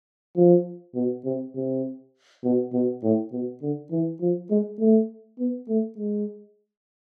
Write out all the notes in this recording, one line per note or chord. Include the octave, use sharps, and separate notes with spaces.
F3
B2
C3
C3
B2
B2
A2
B2
D3
E3
F3
G#3
A3
B3
A3
G#3